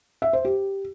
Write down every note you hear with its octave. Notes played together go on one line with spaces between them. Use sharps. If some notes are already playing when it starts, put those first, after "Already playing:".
E5
C5
G4